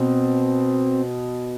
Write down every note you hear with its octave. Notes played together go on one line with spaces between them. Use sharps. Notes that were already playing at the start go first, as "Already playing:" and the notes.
Already playing: B2 C4